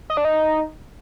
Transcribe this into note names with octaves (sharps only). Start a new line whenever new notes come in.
D#5
D4
D#4